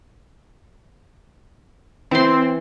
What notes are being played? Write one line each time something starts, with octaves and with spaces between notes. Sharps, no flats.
E3 C4 C6